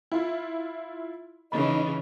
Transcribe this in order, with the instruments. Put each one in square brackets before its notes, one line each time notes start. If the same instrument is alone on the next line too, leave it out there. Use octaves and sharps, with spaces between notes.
[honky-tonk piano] E4 F4
[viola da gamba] C#3 E3 [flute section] D#4 D#5 [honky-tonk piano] B5